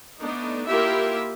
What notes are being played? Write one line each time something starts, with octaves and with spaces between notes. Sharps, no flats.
A3 B3 D4 D#4
A#3 E4 F4 G4 A#4 E5